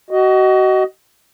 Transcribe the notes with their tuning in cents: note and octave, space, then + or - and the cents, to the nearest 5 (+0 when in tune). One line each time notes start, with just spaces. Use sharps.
F#4 +30 D#5 +0